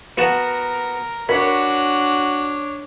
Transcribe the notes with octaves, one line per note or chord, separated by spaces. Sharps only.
B3 F#4 A#4 A5
D4 F#4 A#4 C#5 B5